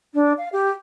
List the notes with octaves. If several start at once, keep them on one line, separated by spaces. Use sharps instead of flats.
D4
F5
G4